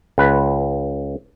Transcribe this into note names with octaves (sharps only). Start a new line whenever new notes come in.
C#2 B4